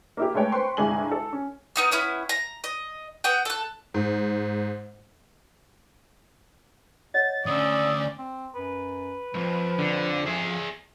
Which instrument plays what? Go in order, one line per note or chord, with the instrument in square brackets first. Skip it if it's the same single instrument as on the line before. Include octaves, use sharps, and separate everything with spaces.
[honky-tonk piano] A#3 E4 G4
G#3 A3 B4 C#5 G5
B4 C5 G5 C6 C#6
G1 C2 G2 G#3 G#5 F#7
A4
C#4
[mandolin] B3 D#4 F6
B3 C#4 E4
A#5
D#5
B3 F#5 G5
A4 F#6
[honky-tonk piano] G#2
[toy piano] C#5 D#5 F#5 [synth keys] A6
[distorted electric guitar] D2 [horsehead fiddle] C#4 D5 [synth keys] D#6 E6
[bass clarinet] C4
[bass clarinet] F#2 [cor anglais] B4
[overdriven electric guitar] C2 F2 [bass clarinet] F3
[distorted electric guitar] D3
G#4 E5